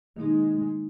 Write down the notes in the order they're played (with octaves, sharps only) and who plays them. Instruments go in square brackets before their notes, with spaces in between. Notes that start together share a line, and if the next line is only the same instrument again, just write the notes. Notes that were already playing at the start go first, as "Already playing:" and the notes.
[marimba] D#3 A#3 D#4 G#4 [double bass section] G#3